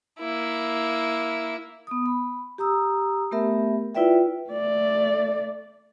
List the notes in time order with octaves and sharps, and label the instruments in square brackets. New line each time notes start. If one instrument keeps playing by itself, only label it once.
[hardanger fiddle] A#3 E4
[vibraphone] B3 D#6
B5
G4 A#5 D#6 E6
A3 B3 G4 A#4 E5
E4 F4 B4 D5 E5 G5
[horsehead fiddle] A3 D5